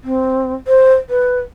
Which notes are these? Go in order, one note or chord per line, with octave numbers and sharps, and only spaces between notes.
C4
C5
B4